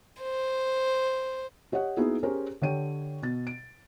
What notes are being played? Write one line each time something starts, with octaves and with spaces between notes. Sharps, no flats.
C5
G4 C#5 D#5 F#5
A#3 B3 D#4 E4 F#4 G#4
C#4 G4 G#4 A#4 C5 C#5
D3 G4 C#5 G5 D#7
B2 A6
D7